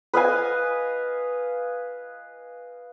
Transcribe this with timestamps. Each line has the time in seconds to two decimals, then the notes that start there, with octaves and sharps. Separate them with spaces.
0.14 B4 D#5 F5 G#5